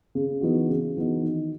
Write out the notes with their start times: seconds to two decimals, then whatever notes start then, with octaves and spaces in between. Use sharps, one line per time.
0.15 C#3
0.41 E3 B3 D#4 F#4
0.69 C#3
0.97 E3 B3 D#4 F#4
1.23 D#3